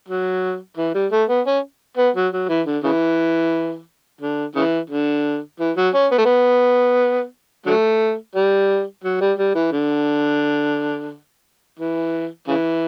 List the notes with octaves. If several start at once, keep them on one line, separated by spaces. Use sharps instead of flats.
F#3
E3
G3
A3
B3
C#4
B3
F#3
F#3
E3
D3
C#3 E3
D3
C#3 E3
D3
E3
F#3
C#4
B3
A3
B3
D3 F#3 A3
G3
F#3
G3
G3
E3
D3
E3
C#3 E3